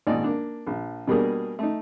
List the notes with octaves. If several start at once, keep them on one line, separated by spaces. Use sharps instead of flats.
G#1 A#2 D5 D#5
A#3 D4
A#1
B2 G3 A#3 D4 G#4 A#4
A3 D#4